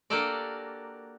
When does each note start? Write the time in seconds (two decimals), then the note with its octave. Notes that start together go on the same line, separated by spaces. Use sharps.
0.10 A#3 D4 F#4 G4 A4 D5